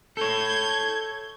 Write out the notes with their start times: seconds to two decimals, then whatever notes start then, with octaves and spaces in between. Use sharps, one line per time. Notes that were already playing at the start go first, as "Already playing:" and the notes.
0.17 A4 C#5 G6 G#6